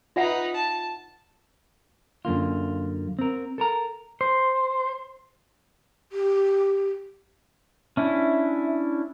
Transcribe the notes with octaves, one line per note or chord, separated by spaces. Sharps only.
D#4 F4 B4 E5 F#5
A5
F#2 D3 A#3 F4
C4 A#4
A4 A#4 A#5
C5
G4
C#4 D4 E4 E5